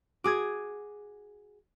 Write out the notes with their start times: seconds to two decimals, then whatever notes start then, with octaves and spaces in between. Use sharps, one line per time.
0.24 F#4 G#4 D6 D#6 G#6